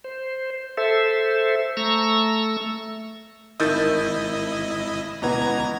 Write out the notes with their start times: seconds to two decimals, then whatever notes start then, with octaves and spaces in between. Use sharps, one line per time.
0.04 C5
0.77 A4 C5 E5
1.77 A3 A#5 C#6 E6
3.60 G#1 D#3 E4 D#5 A5 E6 G6 A6
5.22 C#2 B2 E3 B3 A#5 G#6